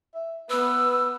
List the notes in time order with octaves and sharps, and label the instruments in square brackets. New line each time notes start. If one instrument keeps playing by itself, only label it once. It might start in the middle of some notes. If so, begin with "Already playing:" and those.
[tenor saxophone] E5
[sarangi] B3 [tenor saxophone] B4 [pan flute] E6